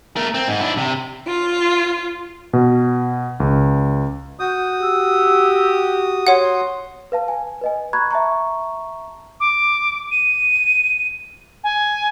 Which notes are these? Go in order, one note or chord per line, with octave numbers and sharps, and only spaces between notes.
A3 A#4
C4
G#2
D4 E4
C3
F4
B2
C#2
F#4 D#6 G6
G4 E6
C#5 F#5 C6
B4 F5 A5
G#5
B4 D#5 G#5
A#5 B5 C#6 F#6 G#6
E5 A5 A#5 C#6
D6
D#7
G#5